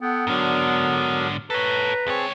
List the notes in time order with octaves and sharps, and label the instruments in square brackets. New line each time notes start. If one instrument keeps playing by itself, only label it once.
[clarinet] B3 [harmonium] A4 F#5 G5
[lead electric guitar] G#2 D3 [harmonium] F#3 D4 A#4
[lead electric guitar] A4 C#5 [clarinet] B4 [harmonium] A#5
[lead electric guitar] C#2 C#5 [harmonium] C4 G#4 A5